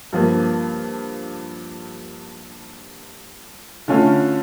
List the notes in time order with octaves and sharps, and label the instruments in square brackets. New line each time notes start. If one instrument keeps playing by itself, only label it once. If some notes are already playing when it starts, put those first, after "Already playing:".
[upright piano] G2 F3 A#3
D3 A3 C#4 F4